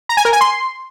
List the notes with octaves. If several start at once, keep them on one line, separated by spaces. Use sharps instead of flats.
A#5
G#5
A#4
G#5
C6